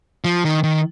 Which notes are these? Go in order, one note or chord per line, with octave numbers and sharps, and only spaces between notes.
F3
D#3
D#3